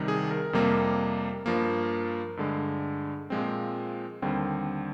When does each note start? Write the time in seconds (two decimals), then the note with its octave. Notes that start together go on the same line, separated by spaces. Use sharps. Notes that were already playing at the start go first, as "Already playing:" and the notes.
Already playing: C2 C3 D#3 G3
0.08 G#4
0.31 A#4
0.53 F2 C3 G3 A#3
1.46 G2 F3 A#3
2.37 G2 D3 G#3
3.30 A#2 F3 G#3 C4
4.22 D#2 D3 G3 C4